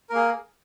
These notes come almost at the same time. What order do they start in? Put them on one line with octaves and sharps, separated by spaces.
A#4 A#3 G#4